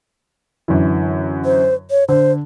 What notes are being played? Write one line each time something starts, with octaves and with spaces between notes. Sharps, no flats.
F#2 D3 E3
C5
C#5
D3 C5